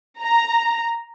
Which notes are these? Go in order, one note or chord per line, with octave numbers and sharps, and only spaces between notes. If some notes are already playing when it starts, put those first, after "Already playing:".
A#5